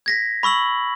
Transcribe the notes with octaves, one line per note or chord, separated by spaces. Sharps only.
G#6 A#6 B6
B5 C#6 E6 F#7